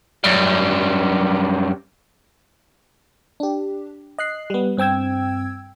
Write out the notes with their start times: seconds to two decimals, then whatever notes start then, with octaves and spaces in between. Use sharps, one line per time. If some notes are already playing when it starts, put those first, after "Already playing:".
0.24 F#2 G3
3.40 D4 G4
4.18 D#5 F#6 C7
4.50 G3 B3
4.77 G2 C4 G5 E6 G#6